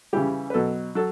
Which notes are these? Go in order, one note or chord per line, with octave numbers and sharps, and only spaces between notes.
C#3 E3 G3 G4
B4
B2 F#3 A4
F#3 A4